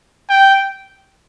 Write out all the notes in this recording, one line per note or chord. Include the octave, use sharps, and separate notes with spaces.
G5